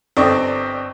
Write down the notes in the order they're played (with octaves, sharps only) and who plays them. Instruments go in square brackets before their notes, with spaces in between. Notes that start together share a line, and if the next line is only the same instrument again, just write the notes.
[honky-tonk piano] G1 C4 A4 D5 D#5 C#6